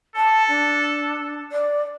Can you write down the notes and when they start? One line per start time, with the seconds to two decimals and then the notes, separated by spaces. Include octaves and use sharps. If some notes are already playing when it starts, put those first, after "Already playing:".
0.16 A4 A5
0.48 D4
1.51 D5